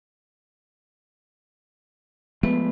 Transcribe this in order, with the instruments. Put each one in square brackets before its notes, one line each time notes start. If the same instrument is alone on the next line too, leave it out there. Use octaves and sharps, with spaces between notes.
[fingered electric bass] F3 G#3 A3 [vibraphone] B3 B4